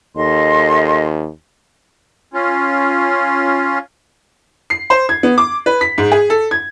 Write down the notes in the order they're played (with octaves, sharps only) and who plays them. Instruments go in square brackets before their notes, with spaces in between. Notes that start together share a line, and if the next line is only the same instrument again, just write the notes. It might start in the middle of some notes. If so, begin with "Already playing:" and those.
[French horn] D#2 [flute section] A4 D#5 C6
[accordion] C#4 F4
[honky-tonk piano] C7
C5
G#6
B3
D6
B4
B6
G#2
G#4
A4
G#6